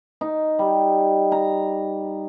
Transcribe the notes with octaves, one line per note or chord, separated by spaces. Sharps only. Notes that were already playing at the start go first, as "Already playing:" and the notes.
D#4
G3
A#5